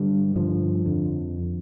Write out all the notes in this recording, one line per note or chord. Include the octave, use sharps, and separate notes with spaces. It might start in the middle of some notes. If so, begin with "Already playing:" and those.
Already playing: G2 D3 G3
G2 D3 F3
F2 D3